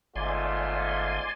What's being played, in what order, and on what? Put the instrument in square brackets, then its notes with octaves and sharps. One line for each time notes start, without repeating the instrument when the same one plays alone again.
[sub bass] G1 [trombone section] G#2 A3 F4 [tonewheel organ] D5 G#5 C6